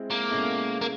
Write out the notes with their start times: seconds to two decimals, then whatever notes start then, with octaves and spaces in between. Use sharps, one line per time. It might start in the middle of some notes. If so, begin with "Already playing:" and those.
Already playing: G#3 C4 E4
0.10 A#3
0.29 B2 G#3 C#4 E4 A4
0.81 A#3